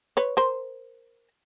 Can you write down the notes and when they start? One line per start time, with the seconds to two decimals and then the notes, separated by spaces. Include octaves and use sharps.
0.17 B4 C#5
0.37 A#4 C5